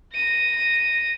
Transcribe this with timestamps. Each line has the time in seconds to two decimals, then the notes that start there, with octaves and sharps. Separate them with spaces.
0.13 A#6 D#7